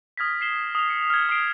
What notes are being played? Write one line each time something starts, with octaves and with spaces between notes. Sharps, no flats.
D#6 F6 G#6 A#6 B6
C7 E7 G7
D#6 F7
C#7
F6 G#6
D#6 C7 D7